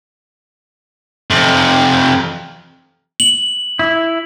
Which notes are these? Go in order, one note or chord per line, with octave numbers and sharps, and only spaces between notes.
F2 C3
F#7
E4